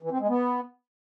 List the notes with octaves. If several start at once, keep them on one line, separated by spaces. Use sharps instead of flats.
E3
C4
G#3
B3